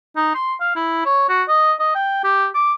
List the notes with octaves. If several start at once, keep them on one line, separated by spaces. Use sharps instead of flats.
D#4
C6
F5
E4
C#5
F#4
D#5
D#5
G5
G4
D6